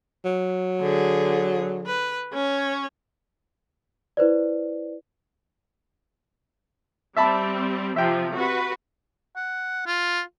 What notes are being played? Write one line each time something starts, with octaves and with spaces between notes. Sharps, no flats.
F#3
D3 G#4
B4
C#4 C#5
E4 B4 C5 D5
G3 C4 E5 A5 B5
C3 F3 E5 G5
F#4 B4
F#5
F4